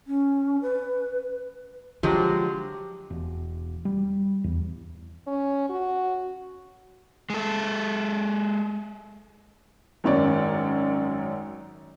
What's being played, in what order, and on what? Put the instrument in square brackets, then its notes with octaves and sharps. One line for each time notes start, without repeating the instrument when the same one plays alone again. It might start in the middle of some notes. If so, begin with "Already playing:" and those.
[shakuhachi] C#4
B4
[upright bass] D3 [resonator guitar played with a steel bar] F3 F#3 G#3 [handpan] G4
[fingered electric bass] E1
G3
E2
[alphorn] C#4
F#4
[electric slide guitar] G#3 A4
[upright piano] G#1 F#2 C#5 D5